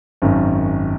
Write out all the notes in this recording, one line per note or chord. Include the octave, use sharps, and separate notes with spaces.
G#1 F#2 D#3